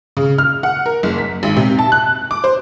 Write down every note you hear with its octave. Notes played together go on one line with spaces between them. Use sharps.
C#3
F6
F#5
A#4
F#1
B6
G#1
C3
A5
F#6
D6
C5